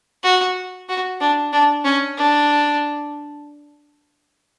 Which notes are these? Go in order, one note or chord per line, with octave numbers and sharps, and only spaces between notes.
F#4
F#4
D4
D4
C#4
D4